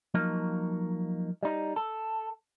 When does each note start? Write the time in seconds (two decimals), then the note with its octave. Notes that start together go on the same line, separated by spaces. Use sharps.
0.14 F3 F#3 A#3 D#4
1.43 G3 D#4
1.76 A4